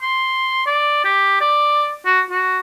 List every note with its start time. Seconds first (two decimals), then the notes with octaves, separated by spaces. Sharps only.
0.02 C6
0.66 D5
1.05 G4
1.41 D5
2.06 F#4
2.31 F#4